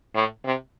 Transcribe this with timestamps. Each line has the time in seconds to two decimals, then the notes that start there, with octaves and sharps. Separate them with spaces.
0.15 A2
0.45 C3